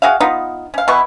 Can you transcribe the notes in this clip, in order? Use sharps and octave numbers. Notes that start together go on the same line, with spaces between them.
F#4 G#4 E5 F5
B3 D#4 F4
C#4 F5
B2 E3 E4 C#6